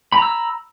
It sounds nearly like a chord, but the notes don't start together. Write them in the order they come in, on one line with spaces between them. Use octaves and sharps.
B5 A#5 E6